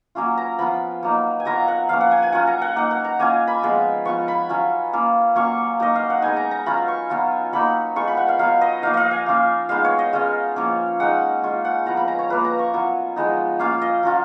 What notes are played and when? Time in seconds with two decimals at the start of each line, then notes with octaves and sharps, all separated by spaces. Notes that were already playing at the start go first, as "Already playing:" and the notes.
0.15 F#3 A#3 C#4 F4
0.37 A#5
0.58 F3 B3 F4 B5
1.03 F#3 A#3 D#4
1.40 G#5
1.45 F#3 B3 F4 A#5
1.68 F#5
1.89 F3 A#3 C#4 F5
2.01 F#5
2.11 G#5
2.22 G#5
2.32 F#3 C#4 F4 F#5
2.47 A#5
2.62 F#5
2.76 A#3 D#4 F#5
2.91 F#5
3.04 A#5
3.19 A#3 C#4 F4 G#5
3.48 B5
3.63 F3 G#3 B3
4.05 F3 B3 F4 C#6
4.28 B5
4.49 F#3 C#4 F4
4.93 A#3 C#4 F4
5.35 F#3 A#3 C#4 F4 C#6
5.80 F#3 A#3 D#4 D#5
5.95 F5
6.10 F#5
6.22 G#3 B3 D#4 G#5
6.37 A#5
6.51 A#5
6.66 F#3 C#4 F4 B5
6.88 C#6
7.10 F#3 B3 F4
7.53 F#3 A#3 D#4 B5
7.96 G#3 B3 F4 C#6
8.07 B5
8.17 F#5
8.29 F5
8.39 F#3 B3 F4 F5
8.61 D#5
8.82 F3 A#3 D#4 F5
8.94 D#5 F5
9.11 G#5
9.26 A#3 C#4 F4
9.69 G#3 B3 D#4 F5
9.85 C#5
9.99 D#5
10.13 G#3 C#4 F4 F5
10.56 F3 A#3 C#4
11.00 G#3 D#4 F#5
11.43 G#3 C#4 F4
11.65 F#5
11.86 F3 B3 F4 A#5
11.97 B5
12.08 A#5
12.19 C#5
12.30 A#3 F4 B4
12.44 A#5
12.59 C#6
12.74 F#3 B3 F4
13.16 F3 G#3 B3 D#4
13.59 A#3 C#4 F4 F5
13.82 D#5
14.03 F#3 C#4 F4